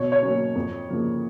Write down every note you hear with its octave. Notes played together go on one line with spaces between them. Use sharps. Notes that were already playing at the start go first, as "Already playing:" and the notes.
Already playing: B2 C#5
C#5
F#3 A#3 C#4
F2
C#3 F3 A#3